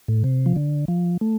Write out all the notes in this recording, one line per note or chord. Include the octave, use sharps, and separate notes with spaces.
A2
C3
F3
D3
F3
A3